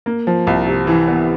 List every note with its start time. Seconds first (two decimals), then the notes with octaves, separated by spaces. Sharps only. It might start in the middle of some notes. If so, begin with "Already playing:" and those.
0.06 A#3
0.27 F3
0.47 C2
0.67 C3
0.87 E3
1.08 B3